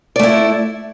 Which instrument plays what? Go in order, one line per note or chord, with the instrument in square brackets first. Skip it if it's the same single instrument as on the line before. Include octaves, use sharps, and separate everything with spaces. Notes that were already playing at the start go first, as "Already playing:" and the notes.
[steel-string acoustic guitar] D5
A3
E4